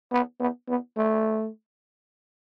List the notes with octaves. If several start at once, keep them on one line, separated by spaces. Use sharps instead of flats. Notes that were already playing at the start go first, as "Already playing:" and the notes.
B3
B3
B3
A3